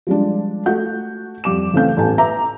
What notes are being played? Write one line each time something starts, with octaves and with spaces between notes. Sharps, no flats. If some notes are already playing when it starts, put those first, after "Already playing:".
F3 G3 G#3 D4
A3 F#4 F#5 G6
F2 G3 D6 E7
C#3 E3 A3 C4 F5 G6
A1 E2 A4 G#5 A5
B4 E5 A#5 D6